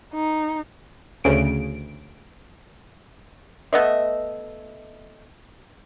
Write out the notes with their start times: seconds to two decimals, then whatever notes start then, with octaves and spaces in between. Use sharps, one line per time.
0.14 D#4
1.24 D2 C#3 D7
3.73 A3 B3 D#5 E5